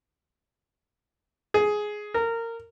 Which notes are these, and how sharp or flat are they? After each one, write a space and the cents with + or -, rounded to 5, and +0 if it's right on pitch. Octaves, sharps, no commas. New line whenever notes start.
G#4 +10
A#4 -20